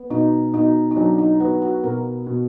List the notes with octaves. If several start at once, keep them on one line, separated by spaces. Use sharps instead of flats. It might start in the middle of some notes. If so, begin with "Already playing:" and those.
Already playing: B3
B2 D#4
B2 D#4
D#4
F#3 D4
D#4
B3 F#4
F#4
B2 A#4
B2